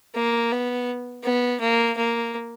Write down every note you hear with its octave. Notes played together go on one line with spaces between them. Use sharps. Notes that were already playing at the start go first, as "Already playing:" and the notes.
A#3
B3
B3
A#3
A#3